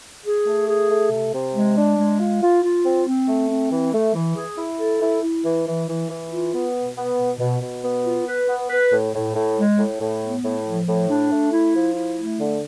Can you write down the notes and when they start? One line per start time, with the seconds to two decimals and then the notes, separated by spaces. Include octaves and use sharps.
0.24 G#4
0.46 A3
0.68 G#4
0.89 A3
1.10 C3
1.33 C3
1.54 G#3
1.76 D4
1.97 G#3
2.20 F4
2.42 F4
2.63 F4
2.84 C4
3.06 C4
3.28 A3
3.49 C4
3.71 E3
3.93 A3
4.15 E3
4.37 G#4
4.58 E4
4.80 A4
5.01 E4
5.23 E4
5.45 E3
5.67 E3
5.88 E3
6.09 E3
6.32 F4
6.54 B3
6.75 B2
6.97 B3
7.18 B2
7.40 B2
7.62 B2
7.84 B3
8.05 F4
8.27 B4
8.48 B3
8.70 B4
8.91 A2
9.14 A2
9.35 A2
9.56 G#3
9.78 A2
10.00 A2
10.22 B3
10.44 A2
10.65 F3
10.87 A2
11.09 D4
11.30 A3
11.52 E4
11.74 F3
11.95 E4
12.17 A3
12.39 D3